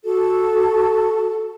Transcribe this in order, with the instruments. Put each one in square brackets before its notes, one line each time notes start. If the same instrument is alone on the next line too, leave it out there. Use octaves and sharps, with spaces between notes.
[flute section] F#4 A4